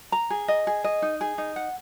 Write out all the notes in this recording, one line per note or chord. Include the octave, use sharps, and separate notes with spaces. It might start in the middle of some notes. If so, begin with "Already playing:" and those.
A#5
G#4
D#5
G#4
D#5
D#4
G#4
D#4
F#5